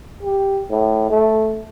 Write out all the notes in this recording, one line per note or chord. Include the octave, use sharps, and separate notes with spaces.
G4
A2
A3